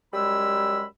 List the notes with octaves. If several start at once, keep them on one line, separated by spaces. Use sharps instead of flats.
F#2 G3 G#3 B5 E6